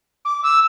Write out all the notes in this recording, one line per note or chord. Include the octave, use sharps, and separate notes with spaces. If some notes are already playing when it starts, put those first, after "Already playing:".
D6
E6